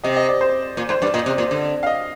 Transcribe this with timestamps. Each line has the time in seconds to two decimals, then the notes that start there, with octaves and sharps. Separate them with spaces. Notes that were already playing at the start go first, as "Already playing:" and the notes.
0.04 C3 D#5
0.16 D#5
0.29 D5
0.41 C5
0.77 A#2
0.89 G#2 C5
1.02 G2 D5
1.14 A#2 D#5
1.26 C3
1.38 A#2
1.51 D3
1.83 F5
1.87 D#5